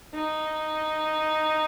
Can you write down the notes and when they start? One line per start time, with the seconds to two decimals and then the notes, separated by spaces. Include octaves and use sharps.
0.14 D#4